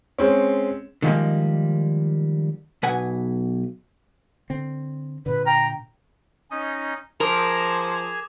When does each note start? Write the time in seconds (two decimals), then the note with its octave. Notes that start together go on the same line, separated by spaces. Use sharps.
0.18 G#3 C4 C#4
1.02 D3 D#3 F3 G3 G#3 A#3
2.83 B1 B4 F#5 G#5
4.50 D3 C4
5.26 A#2 D3 B4
5.46 G5 A#5
6.51 C#4 D#4 D#5
7.20 F3 G#4 A#4 D6 G#6 F7